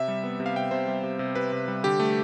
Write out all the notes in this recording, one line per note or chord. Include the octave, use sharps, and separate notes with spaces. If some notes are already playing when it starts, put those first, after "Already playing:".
Already playing: C3 E5
G3
B3
C3
F5
C3 G5
C3 C5
G3
C3
C3
C3 B4
C3
G3
D3 G4
A3